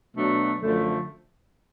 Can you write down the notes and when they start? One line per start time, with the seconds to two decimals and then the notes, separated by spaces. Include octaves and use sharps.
0.16 B2 F#3 A3 D4
0.62 F#2 D3 F3 A3